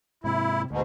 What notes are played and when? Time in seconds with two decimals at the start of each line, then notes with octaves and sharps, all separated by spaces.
0.24 G#2 C3 E4
0.71 D2 G#2 B2